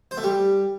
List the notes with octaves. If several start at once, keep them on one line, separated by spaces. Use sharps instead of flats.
C5
A3
G3